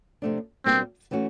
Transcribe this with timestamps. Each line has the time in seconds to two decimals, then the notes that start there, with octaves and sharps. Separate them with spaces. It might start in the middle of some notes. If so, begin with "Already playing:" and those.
0.22 C3 F3 A3 D4
0.66 B2 G3 A#3 C4 D4 G4
1.11 E3 A3 C#4 F#4